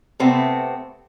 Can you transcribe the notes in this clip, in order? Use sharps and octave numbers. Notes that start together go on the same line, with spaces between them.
C3 A3 B3 C4